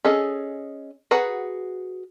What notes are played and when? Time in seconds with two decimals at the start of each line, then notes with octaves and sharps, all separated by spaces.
0.05 C#4 G#4 A4 D#5
1.11 F#4 G#4 B4 F#5 A#5